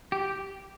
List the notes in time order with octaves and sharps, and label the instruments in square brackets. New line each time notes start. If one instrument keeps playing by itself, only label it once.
[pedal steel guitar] G4